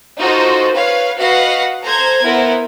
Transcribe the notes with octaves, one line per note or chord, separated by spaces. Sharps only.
D#4 F4 F#4 A4 C5
B4 C#5 F5
F#4 B4 D#5 F5 F#5
A4 C5 A#5 G#6
B3 E4 A#4 C5